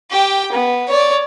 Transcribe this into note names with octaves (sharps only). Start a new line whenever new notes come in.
G4 G5
B3
C#5 D5